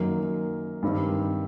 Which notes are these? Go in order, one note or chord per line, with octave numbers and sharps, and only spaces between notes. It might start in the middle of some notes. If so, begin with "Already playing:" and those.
Already playing: F#2 D#3 F#3 A#3
G2 D#3 G3 C4